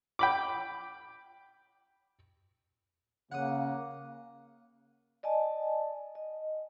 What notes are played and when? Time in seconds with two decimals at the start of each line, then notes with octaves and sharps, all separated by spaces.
0.19 G5 B5 D6
3.32 C#3 A#3 F#5 D#6
5.23 D5 D#5 G#5 A5
6.15 D#5